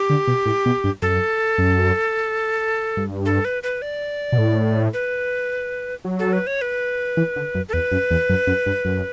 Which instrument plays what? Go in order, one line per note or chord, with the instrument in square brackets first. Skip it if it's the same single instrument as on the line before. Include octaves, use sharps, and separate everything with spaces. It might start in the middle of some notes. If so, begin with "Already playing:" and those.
Already playing: [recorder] G4
[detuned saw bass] D3
B2
A2
B2
G2
[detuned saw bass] F#2 [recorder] A4
[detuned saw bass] F#2
G2
[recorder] A4
B4
B4
D5
[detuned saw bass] B2
A2
[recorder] B4
[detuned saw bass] F#3
[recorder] A4
B4
C#5
B4
[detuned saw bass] E3
D3
F#2
[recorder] A4
[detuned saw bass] E2 [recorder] B4
[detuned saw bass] F#2
E2
F#2
F#2
G2
F#2